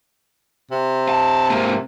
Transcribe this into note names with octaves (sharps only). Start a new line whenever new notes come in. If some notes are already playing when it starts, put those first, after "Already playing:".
C3
A5
G#2 A#3